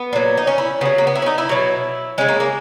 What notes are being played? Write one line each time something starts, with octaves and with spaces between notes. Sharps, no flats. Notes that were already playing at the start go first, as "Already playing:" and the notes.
Already playing: B3
A#2 F#3
D#4
C#4
E4
C#3 F#3 B3
A#3
B3
E4
C#4
D#4
E4
B2 F#3
C#3 G#3 C#4
A#3
A#3